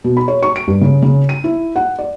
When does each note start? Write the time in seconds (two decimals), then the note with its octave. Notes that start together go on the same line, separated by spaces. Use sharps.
0.04 B2
0.17 B5
0.28 C#5
0.43 C#6
0.56 D7
0.67 G2
0.81 C#3
1.03 C#3
1.29 D#7
1.44 E4
1.76 F#5
1.99 D5